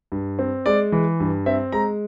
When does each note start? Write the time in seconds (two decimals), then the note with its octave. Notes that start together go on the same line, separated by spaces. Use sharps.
0.12 G2
0.39 C4
0.66 G#3 D5
0.92 E3
1.20 G2
1.46 C4 E5
1.72 G#3 A#5